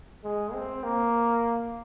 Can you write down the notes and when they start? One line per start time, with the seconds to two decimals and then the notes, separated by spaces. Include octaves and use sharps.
0.23 G#3
0.54 C4
0.84 A#3